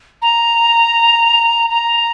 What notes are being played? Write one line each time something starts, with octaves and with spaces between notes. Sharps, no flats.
A#5
A#5